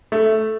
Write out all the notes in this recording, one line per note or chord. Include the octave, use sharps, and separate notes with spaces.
A3